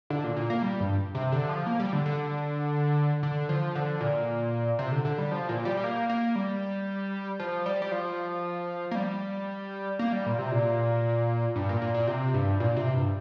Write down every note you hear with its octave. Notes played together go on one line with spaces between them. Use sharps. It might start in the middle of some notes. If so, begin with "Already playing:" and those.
D3
A#2
A#2
A#3
G3
G2
C3
D3
F3
A#3
G3
D3
D3
D3
F3
D3
A#2
C3
D3
D3
G3
F3
A#2
G3
G3
A#3
A#3
G3
F3
G3
G3
F3
A#3
G3
A#3
G3
A#2
C3
A#2
G2
A#2
A#2
A#2
C3
G2
A#2
C3
G2